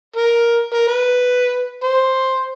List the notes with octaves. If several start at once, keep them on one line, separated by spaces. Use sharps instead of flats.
A#4
A#4
B4
C5